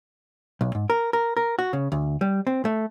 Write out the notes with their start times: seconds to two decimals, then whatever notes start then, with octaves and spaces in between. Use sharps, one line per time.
0.61 B1
0.75 G#2
0.90 A#4
1.13 A#4
1.37 A#4
1.59 F#4
1.73 C#3
1.92 D2
2.21 G3
2.47 C4
2.65 A3